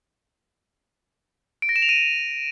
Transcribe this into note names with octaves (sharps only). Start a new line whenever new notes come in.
D7
A#6
E7
F7
D#7